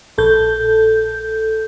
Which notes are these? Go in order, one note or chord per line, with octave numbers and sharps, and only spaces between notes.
A#1 A4 G6